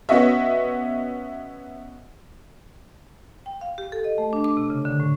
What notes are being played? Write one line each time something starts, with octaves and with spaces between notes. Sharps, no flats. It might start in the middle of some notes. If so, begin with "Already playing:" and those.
B3 C#4 F#4 D#5 E5
G5
F5
G4
A4
D#5
A3
D4
D6
C3
C#3
D3
A2